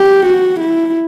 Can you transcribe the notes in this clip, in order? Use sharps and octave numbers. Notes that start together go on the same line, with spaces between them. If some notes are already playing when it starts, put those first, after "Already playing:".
Already playing: G4
F#4
E4